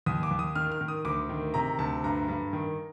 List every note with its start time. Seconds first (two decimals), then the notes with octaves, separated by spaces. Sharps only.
0.06 D#2 D#6
0.23 D6
0.31 D#2
0.39 D#6
0.55 D#3 F6
0.72 F6
0.81 D#3
0.88 D#6
1.05 D2 D6
1.29 D#3
1.54 C3 A#5
1.78 D2 A5
2.04 G2 A#5
2.28 G2
2.53 D#3